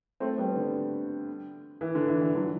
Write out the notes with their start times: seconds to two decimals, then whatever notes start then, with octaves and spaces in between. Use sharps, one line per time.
0.20 A3 C4
0.38 G3 B3
0.56 D3
1.81 E3
1.95 D3
2.08 E3
2.21 E3
2.35 D3 F#3